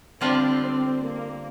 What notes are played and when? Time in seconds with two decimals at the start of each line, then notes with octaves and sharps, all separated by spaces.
0.21 D3 G3 C4 D4 F4
0.62 C4
1.04 A#3